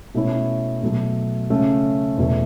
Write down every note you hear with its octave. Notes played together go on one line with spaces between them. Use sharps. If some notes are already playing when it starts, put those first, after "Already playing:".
B2 A3 C#4 E4 C#5
B2 F#3 A3
C#3 A3 C#4
E2 B2 A3